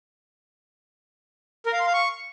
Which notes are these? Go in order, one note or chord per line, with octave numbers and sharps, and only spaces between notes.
A#4
F5
C6
F5
C#6